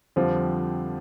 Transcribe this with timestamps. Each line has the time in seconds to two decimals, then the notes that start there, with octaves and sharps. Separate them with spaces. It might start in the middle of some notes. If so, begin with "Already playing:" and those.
0.16 F2 D3 F3 G3 C4 G4